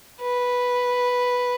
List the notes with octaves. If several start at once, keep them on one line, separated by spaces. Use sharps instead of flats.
B4